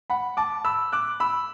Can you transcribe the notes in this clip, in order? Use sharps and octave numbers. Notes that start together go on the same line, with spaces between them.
F#5 B5
A5 D6
B5 E6
D6 F#6
B5 E6